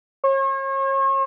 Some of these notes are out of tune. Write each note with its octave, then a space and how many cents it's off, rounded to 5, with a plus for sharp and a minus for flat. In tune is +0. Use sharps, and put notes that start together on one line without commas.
C#5 -40